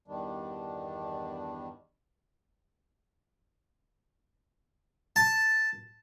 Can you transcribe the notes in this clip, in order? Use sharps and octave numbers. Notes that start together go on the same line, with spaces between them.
E2 G2 D#3 G3 D4
A5